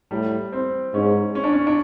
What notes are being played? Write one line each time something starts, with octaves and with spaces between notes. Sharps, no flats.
A2 G3
C4
G#2 C#4
C#4
D4
C#4
D4